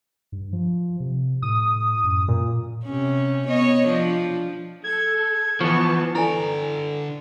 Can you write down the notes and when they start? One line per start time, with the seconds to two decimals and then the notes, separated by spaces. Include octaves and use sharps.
0.32 G2
0.53 F3
1.00 C3
1.42 A2 D#6
2.04 F#2
2.28 A#2
2.84 C3 C#4
3.48 B3 C#5 D#5
3.87 F3 D4
4.84 A4 G#6
5.61 E3 F3 B3 A5 C#6
6.15 D3 E4 A4 B4 D5 G#5 A#5